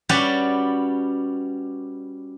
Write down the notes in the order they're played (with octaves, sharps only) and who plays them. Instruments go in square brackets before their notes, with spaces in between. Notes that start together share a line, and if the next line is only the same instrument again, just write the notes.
[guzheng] G3 C#4 F#4 G4 B4 D5